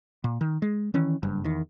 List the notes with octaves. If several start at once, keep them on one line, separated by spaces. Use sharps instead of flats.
A#2
D#3
G#3
D#3 E3 C#4
F#1 G2
E2 D#3